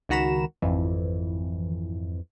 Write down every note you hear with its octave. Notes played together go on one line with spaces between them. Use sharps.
C#2 D#3 F#4 A#5 B5 E7
G#1 F2 E3